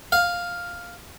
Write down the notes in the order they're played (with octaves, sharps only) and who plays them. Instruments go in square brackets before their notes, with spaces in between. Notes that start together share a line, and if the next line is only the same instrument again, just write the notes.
[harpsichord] F5